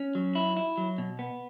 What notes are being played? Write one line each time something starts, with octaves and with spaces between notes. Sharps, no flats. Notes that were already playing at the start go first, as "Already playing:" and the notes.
Already playing: C#4
F#3
E4
E4
F#3
B2
B3